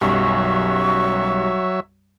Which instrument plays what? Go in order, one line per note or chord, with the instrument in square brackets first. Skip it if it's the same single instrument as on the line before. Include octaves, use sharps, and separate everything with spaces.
[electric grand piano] B1 F#2 G3 [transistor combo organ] F#3 C#5 E5 [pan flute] C#6